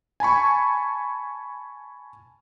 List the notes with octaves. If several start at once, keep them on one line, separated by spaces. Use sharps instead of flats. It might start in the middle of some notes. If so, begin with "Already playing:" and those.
G#5 A5 B5 C#6